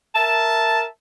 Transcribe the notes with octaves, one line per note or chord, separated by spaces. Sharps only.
A#4 E5 A5